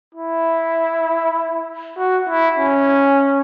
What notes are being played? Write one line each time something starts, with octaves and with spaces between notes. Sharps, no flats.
E4
F#4
E4
C#4